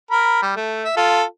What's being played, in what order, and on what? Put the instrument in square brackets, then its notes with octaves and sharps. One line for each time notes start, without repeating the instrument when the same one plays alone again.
[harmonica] A#4 B5
G3
A3
E5
F4 A4